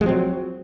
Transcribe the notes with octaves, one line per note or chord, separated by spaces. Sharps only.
F3 F#3 G#3 C4